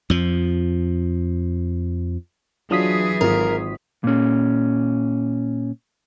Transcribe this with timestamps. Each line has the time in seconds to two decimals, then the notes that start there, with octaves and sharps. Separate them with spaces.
0.10 F2 F3
2.71 E3 F#3 D4 F4 G#4 D#6 B6
3.21 G#1 F4 A#4
4.04 A#2 C#4